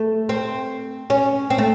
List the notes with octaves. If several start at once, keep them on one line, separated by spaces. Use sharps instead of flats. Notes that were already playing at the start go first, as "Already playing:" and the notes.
Already playing: A3
C4
C#4
C4
A3